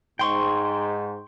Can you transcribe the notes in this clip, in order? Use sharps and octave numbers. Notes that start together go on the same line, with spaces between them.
G#2 G5 C6 C#6